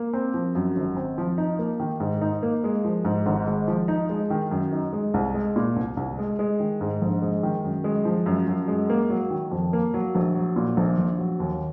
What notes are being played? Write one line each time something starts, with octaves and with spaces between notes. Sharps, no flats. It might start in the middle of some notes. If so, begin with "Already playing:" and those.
Already playing: A#3
C4
F3
F#2
G#1
C4
F3
D#4
A#3
D#3
G#2
D#4
A#3
G#3
F3
G#2
G#1
G#3
F3
D#4
G#3
D#3
F#2
D#4
G#3
C2
G#3
A#2
C2
C2
G#3
G#3
D#3
G#2
A#1
G#3
D#3
F#2
G#3
F3
F#2
F#2
G#3
A#3
F#3
D#3
F2
A#3
F#3
A#1
F#3
A#2
A#1
A#1
F#3
D#2